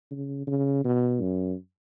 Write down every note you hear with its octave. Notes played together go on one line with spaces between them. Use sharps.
C#3
C#3
B2
F#2